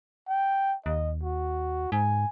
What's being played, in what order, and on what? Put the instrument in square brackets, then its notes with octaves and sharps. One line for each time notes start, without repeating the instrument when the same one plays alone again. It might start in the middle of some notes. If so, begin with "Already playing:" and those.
[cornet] G5
[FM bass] D#2 [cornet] D#5
[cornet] F#4
[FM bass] G#2 [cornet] G#5